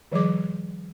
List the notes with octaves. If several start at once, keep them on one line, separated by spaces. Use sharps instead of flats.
D#3 F3 G3 G#4 D6